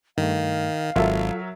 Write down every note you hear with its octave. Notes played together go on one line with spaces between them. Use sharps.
G2 D#3 A3 F5
G#1 F#3 F4 A4 A#4 E5